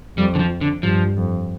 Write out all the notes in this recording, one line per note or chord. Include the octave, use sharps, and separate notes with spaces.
F2 G3
D3
F3
D3
G2 F3
F2